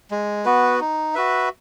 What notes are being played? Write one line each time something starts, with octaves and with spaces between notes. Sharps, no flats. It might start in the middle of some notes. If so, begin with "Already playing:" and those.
G#3
B3 F#4 B4
D#4
F#4 B4 E5